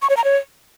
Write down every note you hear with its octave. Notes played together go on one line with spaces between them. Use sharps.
C#6
C#5
A#5
C#5